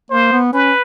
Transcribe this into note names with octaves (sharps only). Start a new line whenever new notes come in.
A#3 C5
B3
C#4 B4